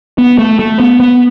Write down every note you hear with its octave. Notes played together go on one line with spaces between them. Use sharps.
B3
A3
A3
B3
B3